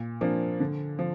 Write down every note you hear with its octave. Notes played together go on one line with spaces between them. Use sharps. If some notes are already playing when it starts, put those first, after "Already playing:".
Already playing: A#2
F3 A#3 D4
D3
F3